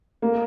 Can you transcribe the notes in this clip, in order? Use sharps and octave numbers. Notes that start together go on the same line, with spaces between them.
A#3